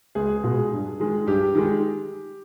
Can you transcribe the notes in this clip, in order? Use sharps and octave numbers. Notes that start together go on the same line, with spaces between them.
C#2 G#4
B2 G#3
G2
D#3 G#3
G2 G4
D#3 G#3